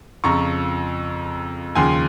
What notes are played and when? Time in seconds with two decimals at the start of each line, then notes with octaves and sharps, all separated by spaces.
0.24 F2 C#3 F3 A#5 C#6
1.75 D#2 C#3 F3 G#5 C6